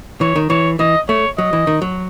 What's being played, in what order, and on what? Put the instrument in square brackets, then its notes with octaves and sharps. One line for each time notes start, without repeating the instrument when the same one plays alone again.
[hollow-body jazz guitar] E3 [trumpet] C#5
[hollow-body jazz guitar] D#3
[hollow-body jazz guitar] E3 [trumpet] C#5
[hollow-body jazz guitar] E3 [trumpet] D#5
[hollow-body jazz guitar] A3 [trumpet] C#5
[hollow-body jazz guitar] F#3 [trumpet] D#5
[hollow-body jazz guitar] E3
D#3
F#3